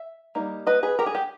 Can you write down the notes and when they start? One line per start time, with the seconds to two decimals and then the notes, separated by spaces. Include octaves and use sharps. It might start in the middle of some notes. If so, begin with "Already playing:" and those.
Already playing: E5
0.35 G3 A#3 D#4
0.67 B4 D#5
0.83 G#4 B4
0.99 G4 A#4
1.06 G#4
1.15 G4